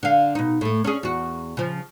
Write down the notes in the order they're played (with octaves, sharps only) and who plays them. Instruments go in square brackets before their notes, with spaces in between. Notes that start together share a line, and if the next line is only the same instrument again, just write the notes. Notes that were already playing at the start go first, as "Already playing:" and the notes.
[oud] D3 F5
B2 D#4
A2 A3
C#4 D4 G#4
E2 F#4
C#3 F3